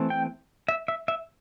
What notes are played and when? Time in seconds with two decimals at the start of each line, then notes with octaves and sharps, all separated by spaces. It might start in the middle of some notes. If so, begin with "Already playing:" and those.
Already playing: E3 A3 C4
0.10 G5
0.68 E5
0.88 E5
1.08 E5